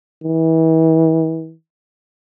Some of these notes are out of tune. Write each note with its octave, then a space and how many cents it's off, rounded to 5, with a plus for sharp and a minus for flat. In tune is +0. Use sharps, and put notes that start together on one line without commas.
E3 -35